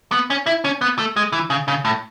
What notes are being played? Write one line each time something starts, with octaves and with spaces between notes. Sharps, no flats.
B3
C#4
E4
C#4
B3
A3
G#3
E3
C#3
C#3
A2